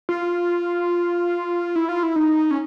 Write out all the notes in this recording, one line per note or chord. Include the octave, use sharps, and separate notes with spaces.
F4
E4
F4
E4
D#4
C#4